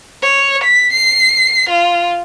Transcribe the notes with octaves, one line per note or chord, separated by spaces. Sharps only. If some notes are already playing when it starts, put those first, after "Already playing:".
C#5
B6
C7
F4